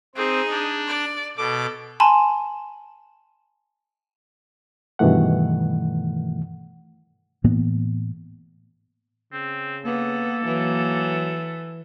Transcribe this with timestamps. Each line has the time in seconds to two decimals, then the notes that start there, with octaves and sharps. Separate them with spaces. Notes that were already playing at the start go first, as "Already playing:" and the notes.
0.15 C4 D#4 G#4
0.50 D4
0.87 D5
1.37 B2 A4 D6
2.00 G#5 A5 B5 C6
4.99 G2 B2 D#3 E3 A3 F#5
7.44 A2 E3 A#3 B3
9.33 C#3 C4
9.85 A#3 B3 A4
10.45 E3 F#3